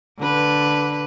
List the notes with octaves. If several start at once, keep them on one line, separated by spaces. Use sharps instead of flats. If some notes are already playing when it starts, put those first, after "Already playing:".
D3 B4